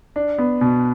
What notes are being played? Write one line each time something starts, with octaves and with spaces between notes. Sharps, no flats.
D4
B3
B2